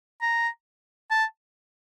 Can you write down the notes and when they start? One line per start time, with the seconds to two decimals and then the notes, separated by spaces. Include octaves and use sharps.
0.22 A#5
1.11 A5